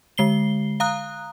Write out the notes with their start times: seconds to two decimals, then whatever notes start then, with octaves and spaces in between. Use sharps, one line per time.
0.18 D3 G#3 C7 G7
0.80 F5 A#5 D#6 F#6